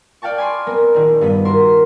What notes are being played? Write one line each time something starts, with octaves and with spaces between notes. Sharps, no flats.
D5 F5 G5 A5 C#6
G#5 B5 C6 D6
B3 C4 A#4
A#1 D#3
G2 B3 B6
F#4 A#4 C5 A#5 C6